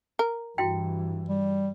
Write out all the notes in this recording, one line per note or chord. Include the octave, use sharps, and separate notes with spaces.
A#4
G2 E3 E4 F#4 G5
G3